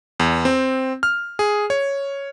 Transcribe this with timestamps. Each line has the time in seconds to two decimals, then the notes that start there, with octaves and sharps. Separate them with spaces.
0.20 E2
0.45 C4
1.03 F6
1.39 G#4
1.70 C#5